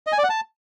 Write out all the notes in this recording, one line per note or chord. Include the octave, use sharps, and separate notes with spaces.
D#5
G#5
D5
F#5
A5